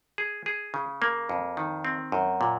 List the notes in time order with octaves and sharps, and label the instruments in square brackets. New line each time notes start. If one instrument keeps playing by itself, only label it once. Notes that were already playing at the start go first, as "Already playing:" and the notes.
[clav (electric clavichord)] G#4
G#4
C#3
A#3
F2
D#3
C4
F#2
A#2